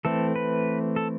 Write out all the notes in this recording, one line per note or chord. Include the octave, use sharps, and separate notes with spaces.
E3 A3 C4 A4
B4
A4